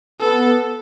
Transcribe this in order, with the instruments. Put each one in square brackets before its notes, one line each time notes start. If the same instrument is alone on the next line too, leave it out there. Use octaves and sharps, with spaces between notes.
[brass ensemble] B3 [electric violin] A4